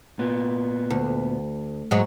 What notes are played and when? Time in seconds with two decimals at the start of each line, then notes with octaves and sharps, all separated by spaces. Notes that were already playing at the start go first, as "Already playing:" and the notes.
0.19 A#2 B3
0.90 D2
1.91 G#2 F#3 G#3